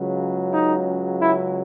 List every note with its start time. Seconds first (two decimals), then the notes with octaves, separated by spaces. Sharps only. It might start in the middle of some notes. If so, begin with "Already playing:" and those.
Already playing: C#2 C#3 F#3
0.54 D#4
1.20 E4